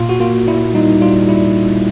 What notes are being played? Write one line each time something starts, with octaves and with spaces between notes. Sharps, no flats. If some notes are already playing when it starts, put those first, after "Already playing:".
Already playing: A#2 F4
F#4
A#3 F4
A#2 E4
G3 D#4
G3 F4
G3 E4